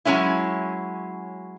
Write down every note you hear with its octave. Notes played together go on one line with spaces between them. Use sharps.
F#3 G#3 C#4 E4